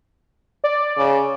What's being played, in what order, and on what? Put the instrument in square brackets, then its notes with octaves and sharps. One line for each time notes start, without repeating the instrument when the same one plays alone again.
[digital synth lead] D5
[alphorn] C#3